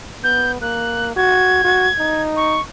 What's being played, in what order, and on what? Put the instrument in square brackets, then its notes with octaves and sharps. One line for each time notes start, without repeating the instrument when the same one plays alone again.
[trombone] B3 [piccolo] G6
[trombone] A#3 [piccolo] F#6
[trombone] F#4 [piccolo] G#6
[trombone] F#4
D#4
[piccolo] C#6